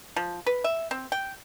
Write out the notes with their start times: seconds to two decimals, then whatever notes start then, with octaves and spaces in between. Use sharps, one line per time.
0.16 F3
0.46 B4
0.64 E5
0.91 C4
1.12 G5